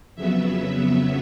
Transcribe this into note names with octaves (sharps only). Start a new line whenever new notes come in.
F2 C#3 F#3 B3 E5